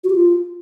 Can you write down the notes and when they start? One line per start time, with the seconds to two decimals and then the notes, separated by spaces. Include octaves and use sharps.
0.04 F#4
0.10 G4
0.15 F4